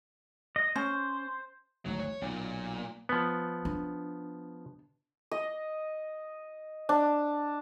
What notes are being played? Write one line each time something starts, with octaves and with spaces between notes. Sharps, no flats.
D#5
C#4 C5
G#1 D2 F#3
C#5
B1 A#2
F3 B3
D4
D#5
D4